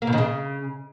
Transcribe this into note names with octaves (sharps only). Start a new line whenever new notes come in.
A#3
B2
D#3
C#3